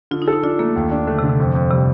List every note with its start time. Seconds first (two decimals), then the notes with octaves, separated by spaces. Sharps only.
0.11 D3 F4
0.22 D#4
0.28 A4
0.33 D#4
0.43 D4 F4
0.59 A3 A#3
0.76 D#2
0.91 D4
1.07 D3 A3
1.19 C3
1.24 D3
1.29 C3
1.40 F2
1.55 F2
1.71 C3 G3